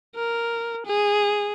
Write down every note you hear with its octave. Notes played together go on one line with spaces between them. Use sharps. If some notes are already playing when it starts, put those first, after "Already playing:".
A#4
G#4